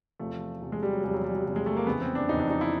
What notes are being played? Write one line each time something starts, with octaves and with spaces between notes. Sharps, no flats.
E2 C3 F3 A3
E2 C3 F3
G#3
G3
F#3
E2 C3 F3 G3
F#3
G3
F#3
E2 C3 F3
G#3
A3
A#3
F2 C#3 E3 B3
C4
D4
F2 C#3 E3 D#4
D4
D#4
E4